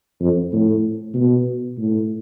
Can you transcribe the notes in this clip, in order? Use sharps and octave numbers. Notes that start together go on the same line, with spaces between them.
F2
A2
B2
A2